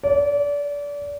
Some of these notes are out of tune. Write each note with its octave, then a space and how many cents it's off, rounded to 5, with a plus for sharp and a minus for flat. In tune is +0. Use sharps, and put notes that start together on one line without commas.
D5 -30